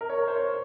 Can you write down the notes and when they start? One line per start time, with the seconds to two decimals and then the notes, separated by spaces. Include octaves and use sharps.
0.01 A#4
0.09 C#5
0.18 A#4
0.28 C5
0.36 C#5